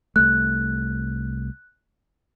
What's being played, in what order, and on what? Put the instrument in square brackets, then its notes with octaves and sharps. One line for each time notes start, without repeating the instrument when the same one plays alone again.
[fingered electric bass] C2 A3 [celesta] F#6